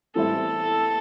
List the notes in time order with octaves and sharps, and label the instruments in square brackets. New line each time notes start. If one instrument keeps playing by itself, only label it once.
[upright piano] A2 E3 G3 C4 E4 [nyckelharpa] A4